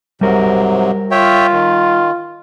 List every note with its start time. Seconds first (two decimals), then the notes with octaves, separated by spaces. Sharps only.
0.21 G#2 C3 F#3 G3 A#4
1.11 F4 C#5 E5 G5
1.53 D#3